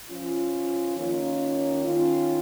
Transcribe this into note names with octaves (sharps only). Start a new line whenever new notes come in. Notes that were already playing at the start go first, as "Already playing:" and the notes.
F3 C#4 F4
D#3 A#3 C#4 F4
D#3 C#4 F4